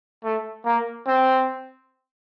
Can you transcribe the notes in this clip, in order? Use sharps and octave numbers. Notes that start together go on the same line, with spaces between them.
A3
A#3
C4